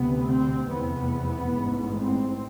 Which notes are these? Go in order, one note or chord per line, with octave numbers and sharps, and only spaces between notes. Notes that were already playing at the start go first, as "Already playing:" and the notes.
Already playing: D2 C3 B3
C4
F1 E2 C3 B3
A1 G#2
C4